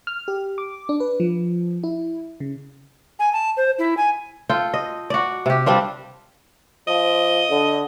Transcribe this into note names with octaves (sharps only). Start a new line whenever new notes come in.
F6
G4
D6
D4
B4
F3
E4
C#3
G#5
A5
C5
E4
G#5
F4 A4 G5
D#5
F#4 D5
C3 G4
G3 C4 D4 F4
F3 D#5
D3